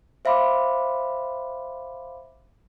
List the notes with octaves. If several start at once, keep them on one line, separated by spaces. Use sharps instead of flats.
C5 E5 F5 B5 C6 D6